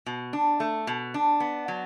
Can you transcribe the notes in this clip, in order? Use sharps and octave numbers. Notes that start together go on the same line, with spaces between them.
B2
D4
A3
B2
D4
B3
F#3